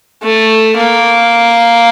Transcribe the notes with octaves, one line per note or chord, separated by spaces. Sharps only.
A3
A#3